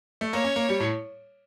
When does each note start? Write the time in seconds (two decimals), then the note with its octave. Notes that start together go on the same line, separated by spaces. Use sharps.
0.21 A3
0.33 A#3 C#5
0.44 C#4
0.56 A#3
0.69 G3
0.80 A2